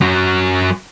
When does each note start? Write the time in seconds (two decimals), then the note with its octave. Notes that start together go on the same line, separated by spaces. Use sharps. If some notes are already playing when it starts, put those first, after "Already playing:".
0.01 F#2 F#3